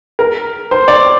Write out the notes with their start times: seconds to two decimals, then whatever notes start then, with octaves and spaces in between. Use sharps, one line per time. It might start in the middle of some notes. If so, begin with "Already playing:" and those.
0.19 A#4
0.71 C5
0.88 D5